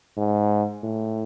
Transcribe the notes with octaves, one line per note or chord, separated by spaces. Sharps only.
G#2
A2